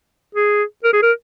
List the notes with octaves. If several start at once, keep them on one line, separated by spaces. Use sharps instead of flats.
G#4
A#4
G#4
A#4